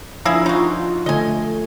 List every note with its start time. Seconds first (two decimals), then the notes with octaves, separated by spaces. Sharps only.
0.25 F3 A#3 D4 E4 G#4
0.46 D#4 F4 F#4
1.06 D3 A3 D#5 G#5